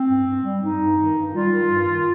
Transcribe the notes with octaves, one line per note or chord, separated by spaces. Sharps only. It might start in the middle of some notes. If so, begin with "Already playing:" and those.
Already playing: C4
G2
G2
G3
G2 D#4
G2
D#3
G2
G3 F4
D#3
G2
D#3